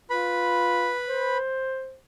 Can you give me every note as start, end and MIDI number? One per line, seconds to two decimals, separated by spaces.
0.10 0.94 65
0.10 1.38 71
0.10 1.38 83
1.08 1.96 72